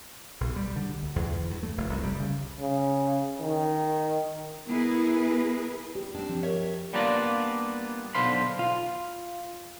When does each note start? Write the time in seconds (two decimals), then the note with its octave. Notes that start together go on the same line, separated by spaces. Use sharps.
0.41 B1
0.56 G3
0.76 D3
1.03 D2
1.16 E2
1.51 G2
1.63 A3
1.78 F1
1.90 C2
2.03 G3
2.20 C#3
2.59 C#3
3.40 D#3
4.66 B3 E4 G#4 A#4 B4
5.95 G4
6.14 C4 D4 G4
6.29 F3
6.43 A#4 C#5 E5
6.93 G3 A#3 B3 D4 F4 D5
8.15 B1 D3 C5 F5 B5 C6
8.59 F4 F5